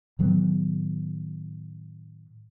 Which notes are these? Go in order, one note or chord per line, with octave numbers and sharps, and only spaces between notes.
A2 D#3 F#3 B3